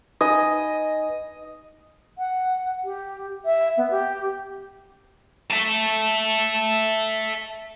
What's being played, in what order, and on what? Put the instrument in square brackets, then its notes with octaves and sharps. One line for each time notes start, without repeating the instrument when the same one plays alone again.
[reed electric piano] D#4 B4 G#5 [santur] D#5
[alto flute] F#5
G4
E5
B3
G4
[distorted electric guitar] E5 A5